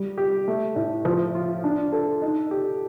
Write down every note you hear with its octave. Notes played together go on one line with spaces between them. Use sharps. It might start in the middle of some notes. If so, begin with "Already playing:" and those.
Already playing: G3
G4
A3
A2
F3
F4
D4
A4
D#4
G4